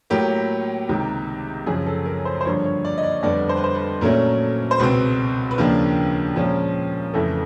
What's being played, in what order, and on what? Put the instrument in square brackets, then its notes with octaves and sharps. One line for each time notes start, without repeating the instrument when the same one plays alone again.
[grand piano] A2 F#3 A#3 G4
C#2 C3 D#3
F#2 C#3 F3 G#4
A4
A#4
C5
C5
G2 D3 F3 A#3 C#5
C#5
D5
D#5
D5
F2 D3 G3 B3 D5
C5
B4
C5
B4
A#2 F#3 A3 C#4 A#4
C5
C#2 B2 G#3 C4 B4
B4
D#2 C#3 F3 A#3 D4 A#4
A#2 F3 G#3 C#4
F2 C#3 E3 A3 A4